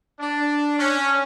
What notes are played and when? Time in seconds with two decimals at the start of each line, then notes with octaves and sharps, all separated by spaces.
0.20 D4
0.79 C#4